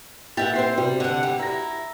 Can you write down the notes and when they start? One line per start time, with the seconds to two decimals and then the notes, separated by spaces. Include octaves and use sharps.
0.37 A#2 E4 G4 E5 F#5 A6
0.56 C4 C5
0.78 C3 G3
1.00 D3 F#5
1.23 G3
1.39 E4 A#5 A#6